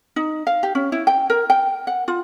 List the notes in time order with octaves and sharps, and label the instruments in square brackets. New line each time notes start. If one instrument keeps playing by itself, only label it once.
[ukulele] D#4
F5
G4
C#4
E4
G5
A#4
G5
F#5
F4